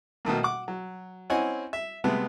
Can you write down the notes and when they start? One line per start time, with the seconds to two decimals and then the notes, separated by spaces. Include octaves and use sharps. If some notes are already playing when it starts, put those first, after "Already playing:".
0.25 B2 D#3 A3 A#3
0.43 F#5 D6
0.68 F#3
1.30 C4 C#4 E4 D#5 F#5 G#5
1.73 E5
2.04 C3 G#3 A3 B3